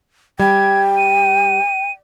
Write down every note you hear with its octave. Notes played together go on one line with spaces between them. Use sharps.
G3 G5 G#6
D#7